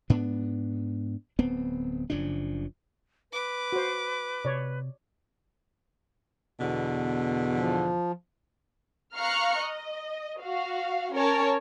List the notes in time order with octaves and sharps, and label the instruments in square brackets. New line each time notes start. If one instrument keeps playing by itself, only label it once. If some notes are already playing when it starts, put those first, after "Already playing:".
[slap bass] G#2 B3 D4
D1 B3 C4
F#1 C#3 F3 D4
[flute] B4 [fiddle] D6
[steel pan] F#4 C5
[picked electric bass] C3 [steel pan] C#5 D5
[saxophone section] E2 B2 D3
[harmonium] F3
[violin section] F5 A#5 C#6 F6 F#6 C#7
D#5
F#4 F5
C#4 A#4 C#5 A5